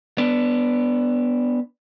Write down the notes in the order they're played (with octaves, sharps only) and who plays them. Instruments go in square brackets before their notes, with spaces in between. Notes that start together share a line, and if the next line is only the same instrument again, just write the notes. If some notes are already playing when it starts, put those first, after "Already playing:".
[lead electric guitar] B3 D4